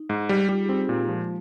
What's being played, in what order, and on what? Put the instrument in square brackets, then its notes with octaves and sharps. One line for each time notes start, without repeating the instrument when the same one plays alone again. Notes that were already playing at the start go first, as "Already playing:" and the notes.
Already playing: [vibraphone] D#4
[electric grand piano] G#2
[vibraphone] D#4
[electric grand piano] G3
[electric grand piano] G3 [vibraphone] F4
[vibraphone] G#4
[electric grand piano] C4 [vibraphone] D#4 G4
[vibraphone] D#4 G4
[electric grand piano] A#2 [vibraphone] G#3
[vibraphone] A#3
[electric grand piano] F3 [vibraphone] G#3